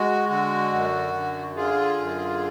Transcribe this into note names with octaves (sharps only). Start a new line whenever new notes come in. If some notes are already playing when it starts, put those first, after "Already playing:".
Already playing: G#3 F#4
D3 F#4
F#2
D3
D3 F4 G#4
F#2